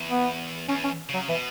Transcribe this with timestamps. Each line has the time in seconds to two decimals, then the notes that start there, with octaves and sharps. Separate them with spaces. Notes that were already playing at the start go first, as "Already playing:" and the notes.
Already playing: E2
0.09 B3
0.69 E2 C#4
0.84 C#4
1.09 C#3 F#3
1.29 B2 E3